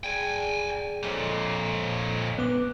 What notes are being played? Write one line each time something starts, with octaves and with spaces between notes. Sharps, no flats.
G#4 D5 G5 G#5
F2 A#2 A4 C#5 D#5
B3 D6